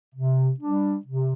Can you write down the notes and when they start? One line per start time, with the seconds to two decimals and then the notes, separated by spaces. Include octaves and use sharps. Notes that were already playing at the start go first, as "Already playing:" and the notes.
0.15 C3
0.61 G3 D4
1.06 C3